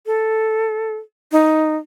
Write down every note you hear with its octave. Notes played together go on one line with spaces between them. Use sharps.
A4
D#4